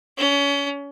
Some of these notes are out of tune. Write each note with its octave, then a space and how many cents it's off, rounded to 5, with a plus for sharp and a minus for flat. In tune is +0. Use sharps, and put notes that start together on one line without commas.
C#4 +30